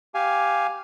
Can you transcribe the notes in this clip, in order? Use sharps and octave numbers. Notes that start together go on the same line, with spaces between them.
G4 F5 G#5